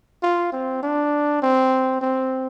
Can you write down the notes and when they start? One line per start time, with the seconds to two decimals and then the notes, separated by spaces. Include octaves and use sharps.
0.23 F4
0.52 C4
0.83 D4
1.42 C4
2.01 C4